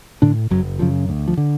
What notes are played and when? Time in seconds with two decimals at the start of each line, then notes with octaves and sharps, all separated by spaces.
0.22 A2 D3 D4
0.50 F#1 F#2 F#3
0.79 F#2 C#3 F3
1.09 D2
1.28 F3
1.37 D3